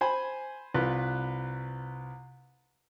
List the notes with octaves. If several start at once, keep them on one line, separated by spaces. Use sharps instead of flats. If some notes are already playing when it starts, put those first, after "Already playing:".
C5 G#5 B5
C2 F4 B4